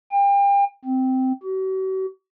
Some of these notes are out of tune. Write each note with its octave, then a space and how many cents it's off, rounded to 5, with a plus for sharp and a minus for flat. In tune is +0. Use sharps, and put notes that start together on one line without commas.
G5 +35
C4 -10
F#4 +45